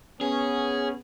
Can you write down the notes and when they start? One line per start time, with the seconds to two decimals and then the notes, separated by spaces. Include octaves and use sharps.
0.21 B3 C#4 G#4